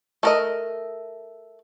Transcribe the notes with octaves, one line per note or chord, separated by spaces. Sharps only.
A3 A#4 D#5